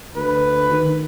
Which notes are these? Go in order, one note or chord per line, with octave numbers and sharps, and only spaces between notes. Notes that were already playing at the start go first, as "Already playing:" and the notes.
D2 B4
D#3